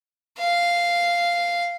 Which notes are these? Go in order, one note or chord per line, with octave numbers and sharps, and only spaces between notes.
F5